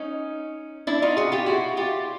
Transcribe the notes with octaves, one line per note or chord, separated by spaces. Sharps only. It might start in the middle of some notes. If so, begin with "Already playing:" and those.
Already playing: C#4 D#4
D4 E4
D#4 F4
F#4 G#4
F4 G4
E4 F#4
F4 G4